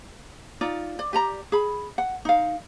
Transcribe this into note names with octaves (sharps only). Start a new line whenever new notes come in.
D#4 F4 D5
D5
G4 D5 A#5
G#4 B5
F#5
D#4 F5